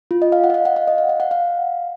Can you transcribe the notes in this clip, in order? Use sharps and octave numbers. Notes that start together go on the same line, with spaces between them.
F4
D#5
F5
F#5
D#5
F5
F#5
F5
D#5
F5
F#5
F#5
F5